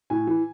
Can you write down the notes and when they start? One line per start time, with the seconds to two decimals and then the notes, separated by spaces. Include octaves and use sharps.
0.10 A2 G#5
0.27 E3